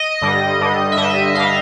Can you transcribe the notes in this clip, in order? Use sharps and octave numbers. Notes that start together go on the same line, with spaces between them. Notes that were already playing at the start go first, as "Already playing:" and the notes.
Already playing: D#5
G2 D3 G3
G2 D3 G3
E5
G2 D3 G3 D#5
G2 D3 G3 F5